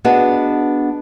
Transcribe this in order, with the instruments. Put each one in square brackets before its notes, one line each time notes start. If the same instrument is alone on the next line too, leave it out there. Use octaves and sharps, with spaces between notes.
[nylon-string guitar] B3 D4 F#4 G#4 B4 D#5